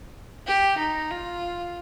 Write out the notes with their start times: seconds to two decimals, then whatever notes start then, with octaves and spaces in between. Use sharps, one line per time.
0.47 G4
0.78 D#4
1.11 F4